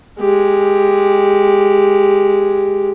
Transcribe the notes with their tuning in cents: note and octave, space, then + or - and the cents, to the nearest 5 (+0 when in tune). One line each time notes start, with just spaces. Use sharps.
G#3 +0 G4 +0